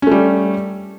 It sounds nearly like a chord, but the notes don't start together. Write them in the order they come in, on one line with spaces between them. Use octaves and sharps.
C#4 A3 G3